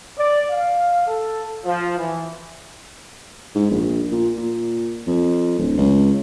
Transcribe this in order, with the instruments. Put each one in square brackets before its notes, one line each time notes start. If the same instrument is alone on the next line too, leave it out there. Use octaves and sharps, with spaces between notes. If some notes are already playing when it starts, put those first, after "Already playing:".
[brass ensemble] D5
F5
A4
F3
E3
[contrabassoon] G#2
A#1
A#2
A#2
F2
D1
C#2